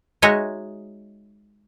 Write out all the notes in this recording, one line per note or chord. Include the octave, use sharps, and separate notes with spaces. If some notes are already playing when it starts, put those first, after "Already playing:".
G#3 D#4 F#4 C#5 D#5 E5